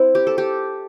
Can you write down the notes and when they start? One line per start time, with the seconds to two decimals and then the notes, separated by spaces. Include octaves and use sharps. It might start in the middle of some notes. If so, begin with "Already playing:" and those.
Already playing: C4 E4
0.15 G4
0.27 A4
0.38 G4